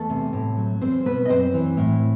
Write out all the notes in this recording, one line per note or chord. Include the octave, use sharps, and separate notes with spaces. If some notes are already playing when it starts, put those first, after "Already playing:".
Already playing: E2 A3 A4
C3
A2
F#3
E2 C4 C5
B2 B3 B4
D#5
F#2 C4 C5
E3
A2